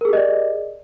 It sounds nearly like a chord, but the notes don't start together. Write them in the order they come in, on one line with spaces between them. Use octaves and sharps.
A#4 G#4 G4 D#5 D5